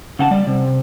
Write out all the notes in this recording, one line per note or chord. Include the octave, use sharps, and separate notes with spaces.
C#3 F#5 A5
G3 D5
C3